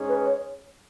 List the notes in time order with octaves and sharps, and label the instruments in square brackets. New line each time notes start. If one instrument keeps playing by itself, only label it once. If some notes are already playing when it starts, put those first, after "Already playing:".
Already playing: [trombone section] G#2 G#3 C#4 G#4
[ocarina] B4
C#5